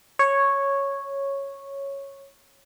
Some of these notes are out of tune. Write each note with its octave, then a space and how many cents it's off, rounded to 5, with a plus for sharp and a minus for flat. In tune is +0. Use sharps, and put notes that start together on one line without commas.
C#5 -5